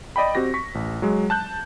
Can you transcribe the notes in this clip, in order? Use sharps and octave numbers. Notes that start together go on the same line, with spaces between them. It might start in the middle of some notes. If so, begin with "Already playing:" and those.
D5 D#5 G5 B5
C4 F#4 G4 A#6
C#6 B6
A1
F#3 G#3
A5 F#6 G6